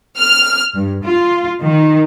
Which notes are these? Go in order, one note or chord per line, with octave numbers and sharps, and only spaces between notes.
F6
G2
F4
D#3